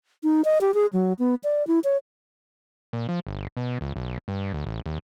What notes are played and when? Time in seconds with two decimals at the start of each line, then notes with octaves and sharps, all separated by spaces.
0.23 D#4
0.45 D#5
0.61 G4
0.74 G#4
0.93 F#3
1.19 B3
1.44 D5
1.67 E4
1.84 C#5
2.93 A#2
3.09 F3
3.27 G1
3.57 B2
3.81 C#2
3.96 B1
4.28 G2
4.53 D2
4.66 A1
4.86 D#2